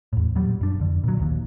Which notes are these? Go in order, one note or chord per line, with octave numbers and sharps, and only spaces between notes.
E2 A2
A#2 F#3 G3
F#2 D4
F2 D3
A#2 F#3
D#1 A#1 D#2